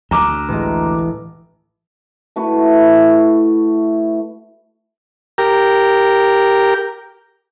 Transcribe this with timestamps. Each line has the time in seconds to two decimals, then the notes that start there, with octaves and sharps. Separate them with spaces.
0.11 D2 A#5 D6
0.49 A1 G#3 D#5
2.36 A3 E4 F#4 B4
5.38 G4 A#4